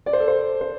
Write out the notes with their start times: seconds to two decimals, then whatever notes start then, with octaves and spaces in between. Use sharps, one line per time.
0.06 D5
0.13 C5
0.20 A4
0.28 C5
0.61 C5